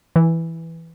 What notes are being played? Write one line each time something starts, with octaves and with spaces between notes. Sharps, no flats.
E3